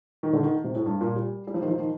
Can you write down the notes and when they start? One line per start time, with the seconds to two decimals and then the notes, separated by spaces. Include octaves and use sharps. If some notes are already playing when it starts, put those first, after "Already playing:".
0.23 D#3
0.33 D3
0.44 D#3
0.64 C3
0.75 A2
0.86 G2
1.01 A#2
1.16 G3
1.47 G3
1.54 F3
1.62 D#3
1.68 F3
1.79 D#3